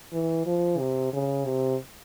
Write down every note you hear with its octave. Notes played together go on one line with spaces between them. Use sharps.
E3
F3
C3
C#3
C3